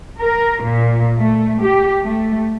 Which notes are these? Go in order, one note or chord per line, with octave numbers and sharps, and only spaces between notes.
A#4
A#2
A3
G4
A3